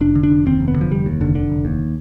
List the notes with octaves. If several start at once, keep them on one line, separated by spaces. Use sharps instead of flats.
F1 D4
D3
D4
F1
D#2 C4
F1
B3
D3 F3
F1 G3
D#2
F1 D3
D3
F1
D#2